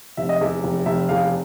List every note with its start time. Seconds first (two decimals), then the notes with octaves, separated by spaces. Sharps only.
0.17 F1 E5
0.29 D#5
0.41 E2 E5
0.64 F1
0.86 F1 E5
1.09 E2 F5